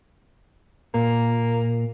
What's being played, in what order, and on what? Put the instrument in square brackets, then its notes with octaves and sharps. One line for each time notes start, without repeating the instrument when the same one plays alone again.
[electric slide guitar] A#2 [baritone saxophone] A#3